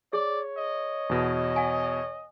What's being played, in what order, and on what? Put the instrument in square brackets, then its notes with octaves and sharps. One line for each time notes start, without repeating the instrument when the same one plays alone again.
[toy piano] G#4 [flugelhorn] C#5 [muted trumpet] D5
[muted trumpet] D#5
[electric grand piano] E2 B2
[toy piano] F#5 G#5